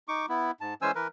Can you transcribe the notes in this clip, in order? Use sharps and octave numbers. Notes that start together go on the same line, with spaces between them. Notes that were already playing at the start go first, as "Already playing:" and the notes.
D#4 C#6 D6
B3 E4
G#2 A5
E3 G#3 C#4 C5 G#5 E6
E3 A#4 B4